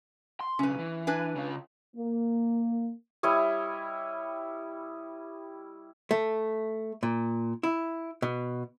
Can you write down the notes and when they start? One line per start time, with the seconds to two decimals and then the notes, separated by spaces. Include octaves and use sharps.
0.41 C6
0.59 B1 C#3 C#4 B4
0.79 E3
1.07 D4 B4 G#5
1.36 C#3 F4
1.96 A#3
3.23 G3 E4 C#5 D#5
6.11 A3
7.03 A#2
7.63 E4
8.22 B2